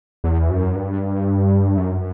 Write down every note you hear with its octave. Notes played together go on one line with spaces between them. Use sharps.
E2
F#2
G2
F#2